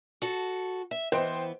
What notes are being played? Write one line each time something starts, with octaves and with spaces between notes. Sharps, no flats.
F#4 A4
E5
E3 B3 C5 D#5 G5